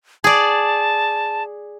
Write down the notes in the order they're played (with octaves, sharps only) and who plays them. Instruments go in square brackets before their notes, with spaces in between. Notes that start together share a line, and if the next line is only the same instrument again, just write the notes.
[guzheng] G#4 D5 [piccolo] A5